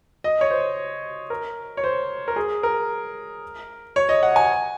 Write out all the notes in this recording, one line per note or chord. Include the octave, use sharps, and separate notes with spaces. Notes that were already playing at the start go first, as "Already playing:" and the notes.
D#5
C#5
C5
A#4
C#5
C5
A#4
G#4
A#4
C#5
D#5
F#5
G#5